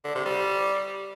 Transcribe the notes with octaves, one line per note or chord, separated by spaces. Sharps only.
D3
C3
G3